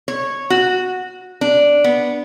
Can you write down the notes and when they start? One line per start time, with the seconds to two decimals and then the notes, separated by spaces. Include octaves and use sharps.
0.08 C#5
0.50 F#4
1.41 D4
1.84 B3